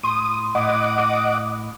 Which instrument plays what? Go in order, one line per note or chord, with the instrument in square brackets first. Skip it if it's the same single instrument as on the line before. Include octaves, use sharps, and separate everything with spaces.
[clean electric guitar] A2 C6 [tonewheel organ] D#6
[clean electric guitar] A2 [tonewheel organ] D#5 F#5 D6 [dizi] D#6